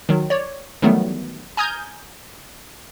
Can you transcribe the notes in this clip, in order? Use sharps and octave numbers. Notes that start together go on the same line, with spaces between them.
D#3 F#3
C#5 D5
D#3 E3 F#3 G3 A3 B3
G#5 A#5 D#6 F6 G6 G#6